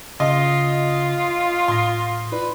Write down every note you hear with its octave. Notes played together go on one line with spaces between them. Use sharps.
C#3 F4 D#5
A2 C6 D#6 A#6
E4 F4 B4 D5